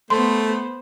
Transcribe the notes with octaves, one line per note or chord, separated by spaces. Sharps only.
A3 B3 C5 C6